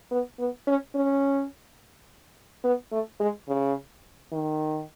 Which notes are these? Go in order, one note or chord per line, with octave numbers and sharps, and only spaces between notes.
B3
B3
C#4
C#4
B3
A3
G#3
C#3
D#3